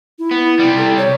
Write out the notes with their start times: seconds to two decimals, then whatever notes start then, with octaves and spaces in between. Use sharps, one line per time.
0.19 E4
0.31 B3
0.59 C3 G3
0.77 A4
0.97 C#5